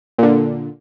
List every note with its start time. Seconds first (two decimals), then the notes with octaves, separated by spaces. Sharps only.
0.18 A#2 D3